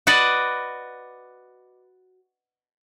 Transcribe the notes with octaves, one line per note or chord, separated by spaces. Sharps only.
F#4 B4 D5 D#5